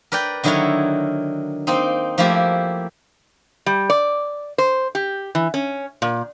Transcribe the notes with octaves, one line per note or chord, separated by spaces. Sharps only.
A#4 B4 D5 G5
D3 D#3 F#3 E4 A#4 C#5
A#3 C4 D#4
F3 A3 A#3 E4 G4
G3
D5
C5
G4
E3
C#4
A#2